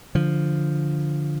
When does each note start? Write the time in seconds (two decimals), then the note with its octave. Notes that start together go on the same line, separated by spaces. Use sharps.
0.15 D3 F3